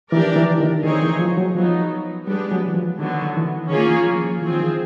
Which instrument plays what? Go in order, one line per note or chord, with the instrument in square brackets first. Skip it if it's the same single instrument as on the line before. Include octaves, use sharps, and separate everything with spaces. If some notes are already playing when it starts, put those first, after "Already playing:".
[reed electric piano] E3 [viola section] D4 G4 A#4 D5
[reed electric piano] E3
D#3
[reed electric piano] D#3 [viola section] C4 D#4 G#4 C#5
[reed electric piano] E3
F3
F#3
[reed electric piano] F3 [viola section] F#3 B3 D#4
[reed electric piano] G3 [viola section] G#3 B3 D4 G4 B4
[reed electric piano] F#3
E3
F3
[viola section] D3 F#3 B3 [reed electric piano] D#3
[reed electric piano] D#3
E3
D#3
[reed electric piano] D#3 [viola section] A#3 C#4 F4 G#4 C#5
[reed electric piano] E3
F3
F3
[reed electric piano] E3 [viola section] C4 F4 G#4
[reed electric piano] D#3
E3